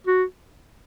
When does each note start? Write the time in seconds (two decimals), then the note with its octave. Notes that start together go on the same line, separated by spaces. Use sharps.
0.07 F#4